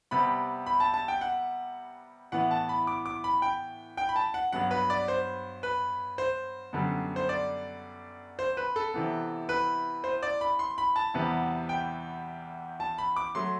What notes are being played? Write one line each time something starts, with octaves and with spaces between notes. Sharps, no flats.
C3 G3 B3 B5
B5
A5
A5
G5
F#5
A2 E3 B3 F#5
A5
B5
D6
D6
B5
G5
G5
B5
A5
F#5
G2 F#3 B3 F#5
B4
D5
C5
B4
C5
F#2 D3 G3 B3
C5
D5
C5
B4
A4
C3 E3 B3
B4
C5
D5
B5
C6
B5
A5
E2 C3 G3 B3
G5
A5
B5
D6
F#3 A3 C6